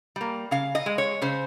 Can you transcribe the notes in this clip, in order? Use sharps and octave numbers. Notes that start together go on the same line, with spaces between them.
G3 A#3
C#3 F5
D#5
G#3
C#5
C#3 C5